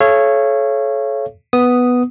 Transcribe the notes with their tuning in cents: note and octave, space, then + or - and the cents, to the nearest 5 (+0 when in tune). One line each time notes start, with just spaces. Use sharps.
A4 -35 C#5 -10 F5 -40
B3 +0 D#6 +0